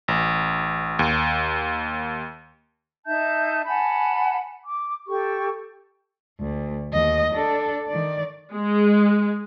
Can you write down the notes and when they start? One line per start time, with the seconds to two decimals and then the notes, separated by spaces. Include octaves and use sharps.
0.08 A1
0.99 D#2
3.06 D#4 E5 A5 G6
3.67 F#5 G#5 A5 B5
4.65 D6
5.08 G4 A4 C#6
6.39 D2
6.93 D#2 D#5
7.34 D4 A4
7.89 D#3 D5
8.53 G#3